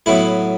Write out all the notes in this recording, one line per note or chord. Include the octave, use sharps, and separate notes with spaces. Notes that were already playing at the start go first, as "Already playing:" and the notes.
A2 F#3 B3 E4